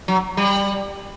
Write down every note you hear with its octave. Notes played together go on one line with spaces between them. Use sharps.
F#3
G3